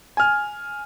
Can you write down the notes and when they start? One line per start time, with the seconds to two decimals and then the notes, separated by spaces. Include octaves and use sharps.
0.17 G#5 F6